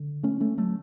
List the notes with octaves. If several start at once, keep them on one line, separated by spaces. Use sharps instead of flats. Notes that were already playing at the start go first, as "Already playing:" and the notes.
Already playing: D3
A3 C#4
A3 C#4
F#3 A3